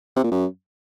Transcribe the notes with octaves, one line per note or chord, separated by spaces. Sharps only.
C3
A#2
F#2